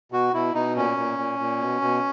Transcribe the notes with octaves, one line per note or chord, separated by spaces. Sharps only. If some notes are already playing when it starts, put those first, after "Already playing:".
B2 F#4
B2 E4
B2 D#4
A#2 C#4
A#2
A#2
A#2
B2
B2